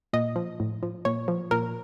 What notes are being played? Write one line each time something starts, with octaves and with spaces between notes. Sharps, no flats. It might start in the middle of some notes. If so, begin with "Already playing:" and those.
A#2 D#5
F3
A2
F3
A#2 C#5
F3
A#2 A#4